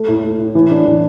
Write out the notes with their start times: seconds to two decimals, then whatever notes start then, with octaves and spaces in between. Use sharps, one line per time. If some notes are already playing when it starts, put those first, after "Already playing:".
Already playing: A3
0.08 A2
0.24 A2
0.40 A2
0.55 E3
0.71 D4
0.86 E3